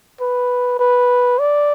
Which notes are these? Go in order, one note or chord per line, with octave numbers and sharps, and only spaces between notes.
B4
B4
D5